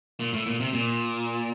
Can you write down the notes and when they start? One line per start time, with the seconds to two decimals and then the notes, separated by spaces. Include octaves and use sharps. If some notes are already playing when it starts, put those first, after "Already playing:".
0.20 A#2
0.33 A2
0.46 A#2
0.60 C3
0.73 A#2